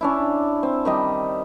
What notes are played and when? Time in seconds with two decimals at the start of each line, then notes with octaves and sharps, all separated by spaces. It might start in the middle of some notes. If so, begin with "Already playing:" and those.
0.01 C#4 D4 E4
0.63 C4
0.85 D#3 G3 D#5